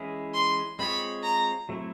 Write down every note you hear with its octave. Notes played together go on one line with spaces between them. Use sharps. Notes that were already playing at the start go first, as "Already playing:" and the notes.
Already playing: E3 G#3 C#4 E4 G#4
C6
G#3 C4 F4 G#4 C#5 B5
A#5
F#3 A3 C4 E4